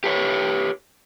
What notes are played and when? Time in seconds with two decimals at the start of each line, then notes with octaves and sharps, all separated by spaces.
0.04 G4 B4 C#5